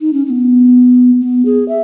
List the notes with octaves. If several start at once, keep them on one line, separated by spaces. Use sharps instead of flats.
D#4
C#4
C#4
B3
B3
G#4
E5